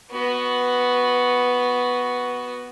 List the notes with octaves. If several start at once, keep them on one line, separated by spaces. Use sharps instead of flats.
B3 F#4